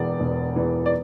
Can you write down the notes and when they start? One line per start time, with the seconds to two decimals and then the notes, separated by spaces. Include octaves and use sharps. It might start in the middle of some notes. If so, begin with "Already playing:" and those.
Already playing: E1 E2 E3 D5
0.20 E1
0.56 E2 E3
0.86 D5